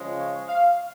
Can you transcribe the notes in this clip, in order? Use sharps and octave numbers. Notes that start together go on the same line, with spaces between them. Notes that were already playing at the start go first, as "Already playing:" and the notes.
Already playing: C#3 F3 G#3
C#5
F5